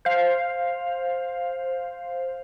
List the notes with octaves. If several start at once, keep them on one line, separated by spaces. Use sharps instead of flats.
C5 F5